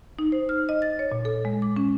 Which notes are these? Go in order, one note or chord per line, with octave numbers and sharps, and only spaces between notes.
D#4
C5
F6
D#5
A6
C#5
A#2
A4
G#3
D6
C#4